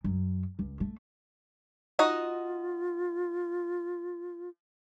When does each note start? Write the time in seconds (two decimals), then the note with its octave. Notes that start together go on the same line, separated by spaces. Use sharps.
0.04 F#2
0.59 C#2
0.80 A3
1.99 D#4 F4 F#4 D#5